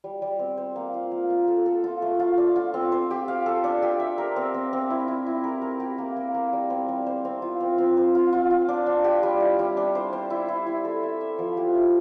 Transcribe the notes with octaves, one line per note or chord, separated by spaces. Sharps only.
G3
G3
C4
C5
A#3
F4
A#3
A#3
A4
A4
F4
A3
F4
D4
F4
C4
C5
G4
F5
A4
D4
G4
E5
A#4
C4
C4
C4
E4
E4
E4
A#4
A#4
G4
A#3
A#3
A#3
G3
C4
G3
C5
C4
F4
C4
C4
C5
F4
F4
F4
D4
D4
G4
G3
E4
G3
D4
C5
C5
E4
E4
E4
A4
E5
E5
F3
G4
E4